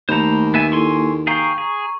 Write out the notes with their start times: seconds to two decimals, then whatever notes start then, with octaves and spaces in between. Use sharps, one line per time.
0.09 D#2 A3 C5 A#5 B5
0.54 B3 E5 G#5
0.72 A#3 E4 A4 G#5 C6 C#6
1.27 G#4 F5 G5 A#5 C#6
1.58 G#4